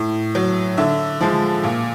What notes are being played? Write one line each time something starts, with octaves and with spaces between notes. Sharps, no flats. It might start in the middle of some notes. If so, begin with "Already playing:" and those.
Already playing: A2
F#3
D3 E5
F3 G#3
A#2